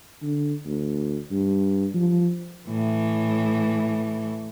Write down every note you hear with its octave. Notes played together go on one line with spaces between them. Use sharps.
D3
D2
G2
F3
A2 E3